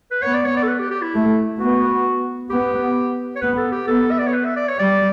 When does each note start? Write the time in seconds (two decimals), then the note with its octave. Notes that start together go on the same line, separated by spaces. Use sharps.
0.11 B4
0.22 B3 C#5
0.33 D5
0.45 C#5
0.57 D5
0.63 A4
0.68 B4
0.79 G4
0.90 G4
1.02 E4
1.14 A3
1.59 B3 F#4
2.50 B3 G4
3.36 C#5
3.41 B3 B4
3.57 A4
3.72 G4
3.87 B3 A4
4.11 E5
4.19 D5
4.26 C#5
4.34 B4
4.45 E5
4.56 D5
4.68 C#5
4.79 G3 D5